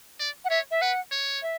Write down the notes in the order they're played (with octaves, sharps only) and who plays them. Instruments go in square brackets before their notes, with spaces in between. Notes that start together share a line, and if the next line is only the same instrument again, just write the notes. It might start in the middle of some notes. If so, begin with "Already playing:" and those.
[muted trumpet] D5
[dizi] F#5
[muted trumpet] C#5 [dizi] E5
[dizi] E5
[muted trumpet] B4 [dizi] F#5
[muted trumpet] C#5
[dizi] E5